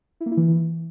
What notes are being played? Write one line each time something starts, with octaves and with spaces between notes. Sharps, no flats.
E4
A#3
E4
E3